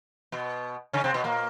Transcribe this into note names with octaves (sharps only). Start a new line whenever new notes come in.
B2 B3
C#3 C#4
C3 C4
B2 B3
A#2 A#3